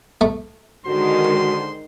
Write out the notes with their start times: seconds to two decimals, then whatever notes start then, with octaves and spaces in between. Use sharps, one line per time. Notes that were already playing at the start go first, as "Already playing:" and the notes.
0.21 A3
0.86 D3 D#3 G#3 F#4 C5 C6